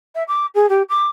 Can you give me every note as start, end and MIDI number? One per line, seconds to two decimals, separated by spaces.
0.15 0.23 76
0.28 0.46 86
0.54 0.66 68
0.69 0.82 67
0.89 1.07 86